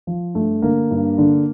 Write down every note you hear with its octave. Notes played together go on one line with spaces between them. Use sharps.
F3
G2 A3
D3 A#3
G2
D3